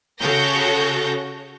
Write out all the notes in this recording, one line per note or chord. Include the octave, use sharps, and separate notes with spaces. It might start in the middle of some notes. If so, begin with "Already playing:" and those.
C#3 F#4 A4 C#5 G6 A#6